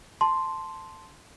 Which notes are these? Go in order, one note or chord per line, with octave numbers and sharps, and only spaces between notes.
A5 C6